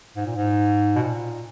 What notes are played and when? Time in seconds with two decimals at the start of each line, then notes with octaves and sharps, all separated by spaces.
0.16 G#2
0.26 A#2
0.36 G#2
0.96 B2
1.00 A#2